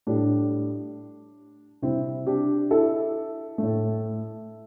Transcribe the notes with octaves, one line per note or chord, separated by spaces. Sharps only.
A2 G3 D4
C3 G3 C4 E4
D4 G4
E4 A4
A2 A3